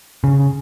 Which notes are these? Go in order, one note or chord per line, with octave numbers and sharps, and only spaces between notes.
C#3